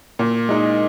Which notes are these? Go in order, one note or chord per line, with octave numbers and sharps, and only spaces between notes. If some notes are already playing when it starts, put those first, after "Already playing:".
A#2
G#3 D#4